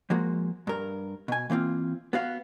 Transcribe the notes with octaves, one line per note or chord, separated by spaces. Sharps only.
F3 G#3 A#3 F#4
G2 A#4
B2 G#5
E3 A#3 C4 F4
B3 F#4 F5